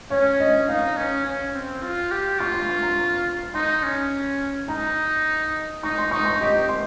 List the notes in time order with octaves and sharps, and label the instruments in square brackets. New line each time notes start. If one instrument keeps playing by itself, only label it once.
[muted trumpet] C#4 [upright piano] C#5
[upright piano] D#5
[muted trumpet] D#4 [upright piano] F5
[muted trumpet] C#4
C#4
C4
F4
G4
[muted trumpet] F4 [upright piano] C#6
[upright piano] C6
C#6
A#5
[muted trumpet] D#4 [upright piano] C6
[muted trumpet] C#4
[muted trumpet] D#4 [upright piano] A#5
[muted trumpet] D#4 [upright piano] C#6
[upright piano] C6
[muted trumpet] D#4 [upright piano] C#6
[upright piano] C#6
[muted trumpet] G4 [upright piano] D#5
[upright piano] C6